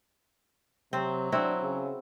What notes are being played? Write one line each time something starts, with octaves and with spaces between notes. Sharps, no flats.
C3 F#3 C4
C4 D4 E4 F#4
C#3